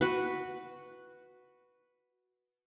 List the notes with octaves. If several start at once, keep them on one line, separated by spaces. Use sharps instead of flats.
F#4 B4